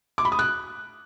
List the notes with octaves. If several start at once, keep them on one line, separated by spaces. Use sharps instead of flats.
D6
B5
D#6
F#6